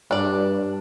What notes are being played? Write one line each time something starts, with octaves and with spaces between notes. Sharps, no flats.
G2 D4 D5